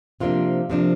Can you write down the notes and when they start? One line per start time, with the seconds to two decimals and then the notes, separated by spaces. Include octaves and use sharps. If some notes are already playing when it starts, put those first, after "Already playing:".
0.20 C3 F3 A#3 D4 F4
0.70 C3 F3 A#3 D4